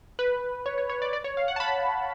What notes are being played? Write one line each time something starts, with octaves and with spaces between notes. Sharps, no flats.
B4
C#5
C#5
C#5
D5
D5
C#5
F5
F#5
A5
B5